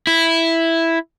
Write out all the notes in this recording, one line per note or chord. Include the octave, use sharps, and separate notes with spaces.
E4